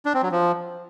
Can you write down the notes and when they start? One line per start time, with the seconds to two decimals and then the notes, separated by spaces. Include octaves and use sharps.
0.05 D4
0.14 C4
0.23 F#3
0.31 F3